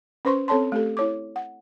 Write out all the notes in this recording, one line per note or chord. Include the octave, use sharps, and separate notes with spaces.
C#4 B4 C5 C6 C#6
C4 A4 C#5 A5 C6
A3 G4 A4
E4 C#5 D6
F#5